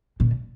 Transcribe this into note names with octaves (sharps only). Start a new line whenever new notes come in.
A#2